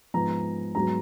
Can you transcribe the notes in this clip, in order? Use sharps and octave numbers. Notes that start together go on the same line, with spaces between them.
G#2 F3 G#3 B3 A#5
G#2 F#3 B3 A#5